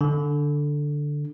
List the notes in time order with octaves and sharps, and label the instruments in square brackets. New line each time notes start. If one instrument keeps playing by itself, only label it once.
[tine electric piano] D3